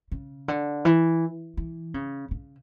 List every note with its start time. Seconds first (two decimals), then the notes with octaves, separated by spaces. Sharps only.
0.12 C#3
0.48 D3
0.85 E3
1.57 E3
1.94 C#3
2.31 C#3